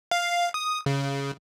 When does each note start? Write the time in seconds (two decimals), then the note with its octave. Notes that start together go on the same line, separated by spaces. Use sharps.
0.11 F5
0.54 D#6
0.86 C#3